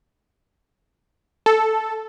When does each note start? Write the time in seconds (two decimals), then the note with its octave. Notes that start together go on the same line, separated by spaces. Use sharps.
1.46 A4